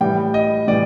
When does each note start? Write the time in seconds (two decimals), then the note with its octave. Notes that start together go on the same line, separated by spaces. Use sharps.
0.01 A2 E3 G3 G5
0.34 D#5
0.67 A2 E3 G3 D5